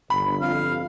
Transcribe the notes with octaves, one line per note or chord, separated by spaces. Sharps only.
G1 B5
F2 F5